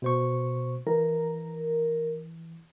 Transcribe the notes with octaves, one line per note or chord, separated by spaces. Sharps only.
B2 C5 C#6
E3 A#4